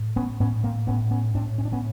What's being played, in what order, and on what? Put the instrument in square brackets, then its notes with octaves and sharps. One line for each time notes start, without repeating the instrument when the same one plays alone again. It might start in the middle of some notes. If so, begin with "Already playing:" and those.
Already playing: [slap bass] A2
B3 C#4
A2 B3 C#4
A#3 C4
A2 B3 C#4
B3 C#4
A2 C4 D4
C#4
D4
B3 C#4